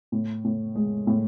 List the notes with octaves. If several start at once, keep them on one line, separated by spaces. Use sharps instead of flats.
A2
A2
G#3
A2